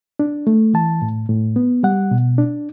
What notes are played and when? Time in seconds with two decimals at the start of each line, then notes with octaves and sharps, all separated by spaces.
0.19 D4
0.47 A3
0.74 E3 A5
1.02 A2
1.29 A2
1.56 B3
1.83 G3 F#5
2.11 B2
2.38 D4